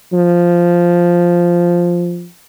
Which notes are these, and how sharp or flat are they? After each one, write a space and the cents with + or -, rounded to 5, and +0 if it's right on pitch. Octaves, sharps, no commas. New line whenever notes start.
F3 -5